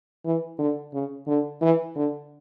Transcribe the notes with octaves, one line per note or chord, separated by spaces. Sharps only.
E3
D3
C#3
D3
E3
D3